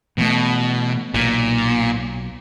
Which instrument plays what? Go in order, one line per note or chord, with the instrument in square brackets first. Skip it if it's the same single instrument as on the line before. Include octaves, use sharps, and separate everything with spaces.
[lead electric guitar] B2 [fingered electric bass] E3 A3
[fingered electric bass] B1 [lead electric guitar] A#2